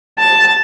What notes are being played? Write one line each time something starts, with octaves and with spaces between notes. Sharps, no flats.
A5